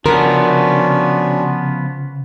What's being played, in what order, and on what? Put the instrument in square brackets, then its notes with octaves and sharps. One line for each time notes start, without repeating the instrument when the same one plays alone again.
[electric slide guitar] C#3 [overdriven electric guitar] F3 B3 [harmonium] C#4 D4 F#4 [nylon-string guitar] A#4